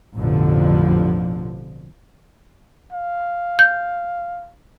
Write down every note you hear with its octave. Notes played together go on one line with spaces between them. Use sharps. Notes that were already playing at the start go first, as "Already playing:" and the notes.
A1 F2 B2 D3 F3
F5
G6